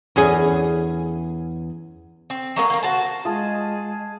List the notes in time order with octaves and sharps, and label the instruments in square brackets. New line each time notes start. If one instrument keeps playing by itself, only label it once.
[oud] E2 C#4 G#4
[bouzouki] C4
F#3 G#3 A#3
D#3 A#3
F#4 C5 A5
[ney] G#3 [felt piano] F4 [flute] G#4 [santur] A5 D#6